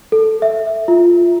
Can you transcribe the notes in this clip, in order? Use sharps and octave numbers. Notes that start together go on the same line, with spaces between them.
A4
E5
F4